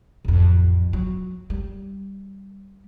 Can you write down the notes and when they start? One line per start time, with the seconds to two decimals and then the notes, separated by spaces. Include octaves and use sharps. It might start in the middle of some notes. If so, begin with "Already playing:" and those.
0.25 A1 F2
0.93 F#3
1.50 G3